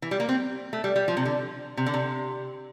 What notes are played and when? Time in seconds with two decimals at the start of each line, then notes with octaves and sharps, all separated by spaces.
0.02 E3
0.11 G3
0.20 A#3
0.29 C4
0.73 A3
0.84 G3
0.96 G3
1.08 F3
1.17 C3
1.26 D3
1.77 C3
1.86 D3
1.94 C3